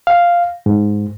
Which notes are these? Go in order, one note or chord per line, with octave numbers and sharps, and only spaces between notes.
F5
G#2